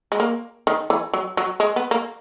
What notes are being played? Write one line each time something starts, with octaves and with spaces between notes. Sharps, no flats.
G#3
A#3
D#3
E3
F#3
F#3
G#3
B3
A#3